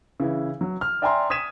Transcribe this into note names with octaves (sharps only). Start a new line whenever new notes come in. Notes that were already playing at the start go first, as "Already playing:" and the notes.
C#3 E3 E4
F#3
F6
D5 E5 G5 G#5 A#5 C6
D#6 G#6 B6 D#7 E7